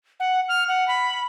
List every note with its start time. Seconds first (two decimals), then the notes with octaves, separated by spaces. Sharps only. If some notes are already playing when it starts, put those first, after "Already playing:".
0.20 F#5
0.49 F6
0.68 F#5
0.88 B5